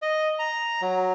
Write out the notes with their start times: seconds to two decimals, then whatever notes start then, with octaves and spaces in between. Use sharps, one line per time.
0.02 D#5
0.39 A#5
0.82 F#3